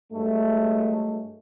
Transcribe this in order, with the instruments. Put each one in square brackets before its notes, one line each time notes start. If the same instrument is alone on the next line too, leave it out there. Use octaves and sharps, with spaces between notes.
[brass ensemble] G2 F#3 G#3 A3